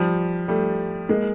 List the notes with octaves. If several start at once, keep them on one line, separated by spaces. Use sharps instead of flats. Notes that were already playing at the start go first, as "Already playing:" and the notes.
Already playing: F3 G3
G3 A3
G#3 A#3